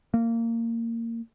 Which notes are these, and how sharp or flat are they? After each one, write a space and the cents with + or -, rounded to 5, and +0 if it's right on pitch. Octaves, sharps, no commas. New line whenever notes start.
A#3 -20